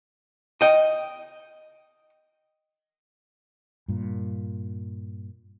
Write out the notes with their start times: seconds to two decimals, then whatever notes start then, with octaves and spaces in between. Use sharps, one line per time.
0.61 D#5 G5
3.88 G2 A#2